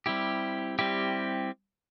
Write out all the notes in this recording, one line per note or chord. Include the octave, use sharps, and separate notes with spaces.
G3 C4 E4 G4
G3 C4 E4 G4